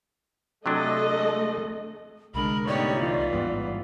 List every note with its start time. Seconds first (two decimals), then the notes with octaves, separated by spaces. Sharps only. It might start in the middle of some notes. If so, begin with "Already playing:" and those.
0.66 C3 F#3 A3 D4 A4 D#5
2.35 C2 D3 G#3 D4 A#4 B5
2.67 A2 B3 D#4 G4 C#5 D5
2.96 E3 F4
3.33 A1 G#2 G3 B3